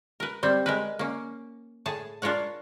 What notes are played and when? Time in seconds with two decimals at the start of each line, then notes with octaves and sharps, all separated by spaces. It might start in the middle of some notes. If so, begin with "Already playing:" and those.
0.20 A#4 B4
0.43 G3 C4
0.66 G#3 A#4 B4
0.99 A#3 C#4
1.86 A2 G#4 A5
2.22 D4 F4 A#4 C#5 F#5